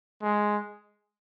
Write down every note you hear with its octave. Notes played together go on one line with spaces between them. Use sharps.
G#3